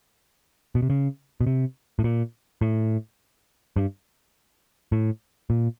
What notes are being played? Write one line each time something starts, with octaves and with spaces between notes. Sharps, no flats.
B2
C3
C#3
B2
C3
A2
A#2
A2
G2
A2
A#2